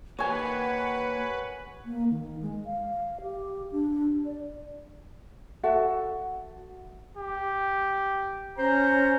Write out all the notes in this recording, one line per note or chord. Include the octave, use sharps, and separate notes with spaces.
A#3 G4 B4 C#5 F#5 G#5
A#3
D#3
G#3
F5
G4
D4
D5
F#4 A4 E5 F#5
G4
C#4 C5 A#5